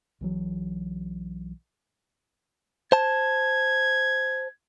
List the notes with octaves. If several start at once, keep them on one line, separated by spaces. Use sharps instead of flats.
B1 E3 F#3
C5 A5 G#6